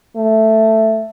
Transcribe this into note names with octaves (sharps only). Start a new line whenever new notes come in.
A3